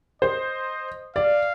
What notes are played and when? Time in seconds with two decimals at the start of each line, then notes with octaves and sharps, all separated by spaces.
0.22 C5 D#5
1.15 D5 F5